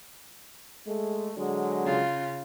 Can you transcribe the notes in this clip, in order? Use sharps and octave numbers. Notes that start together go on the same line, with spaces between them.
G#3 A3
D3 F#3 G#3
C#3 F4